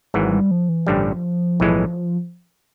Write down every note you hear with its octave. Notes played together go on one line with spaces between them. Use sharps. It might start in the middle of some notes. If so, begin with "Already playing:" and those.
G#1 G#2 E3 F#3
G3
F3
E3
A1 G2 D3 F3 G3
B1 A2 E3 G#3